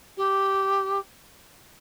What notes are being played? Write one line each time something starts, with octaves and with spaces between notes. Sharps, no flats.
G4